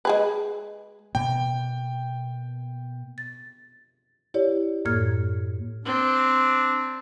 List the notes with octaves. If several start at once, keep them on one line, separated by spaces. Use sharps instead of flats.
G#3 G#4 B4
B2 A#3 G5
A6
E4 G4 C#5 D5
F#2 A2 A#3 F6 G#6
C4 D4